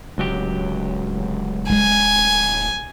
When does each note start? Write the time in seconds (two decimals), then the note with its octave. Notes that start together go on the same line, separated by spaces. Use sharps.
0.18 D1 C#2 F#3 G4
1.70 G#3 G#5